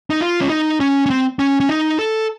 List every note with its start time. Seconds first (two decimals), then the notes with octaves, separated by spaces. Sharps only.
0.10 D#4
0.21 F4
0.41 C#4
0.50 D#4
0.80 C#4
1.06 C#4
1.10 C4
1.39 C#4
1.60 C#4
1.69 D#4
1.99 A4